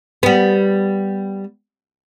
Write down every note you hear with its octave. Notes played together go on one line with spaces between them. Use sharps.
G3 B3